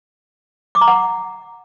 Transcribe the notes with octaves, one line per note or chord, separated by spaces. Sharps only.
D6
A#5
F#5